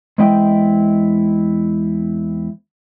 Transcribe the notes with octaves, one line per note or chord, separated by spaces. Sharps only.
E2 G#3 C4 E4 D#5 G5